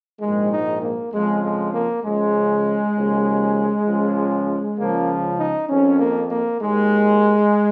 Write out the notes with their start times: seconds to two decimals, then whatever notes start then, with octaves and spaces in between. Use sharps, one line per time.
0.21 A#1 G#2 D#3 G#3
0.52 D#4
0.82 A#3
1.12 F2 C#3 F3 G#3
1.44 G#3
1.74 A#3
2.04 C#2 C#3 F3 G#3
2.96 D#2 C#3 F3
3.87 C#2 C#3 F3
4.79 C#2 C#3 F3 A#3
5.39 D#4
5.69 F2 D#3 C#4
5.99 A#3
6.31 A#3
6.61 D#2 D#3 G#3